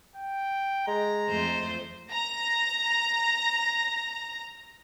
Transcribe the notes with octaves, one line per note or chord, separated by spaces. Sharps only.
G5
G#3 A#5
F2 A3 C5
A#5 A#6